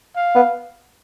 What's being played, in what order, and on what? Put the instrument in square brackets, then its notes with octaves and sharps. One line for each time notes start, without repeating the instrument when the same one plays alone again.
[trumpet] F5
[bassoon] B3